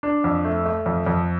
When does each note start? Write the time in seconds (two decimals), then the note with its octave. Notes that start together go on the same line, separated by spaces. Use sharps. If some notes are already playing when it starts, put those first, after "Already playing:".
0.03 D4
0.24 F2
0.45 A3
0.65 A3
0.86 F2
1.06 F2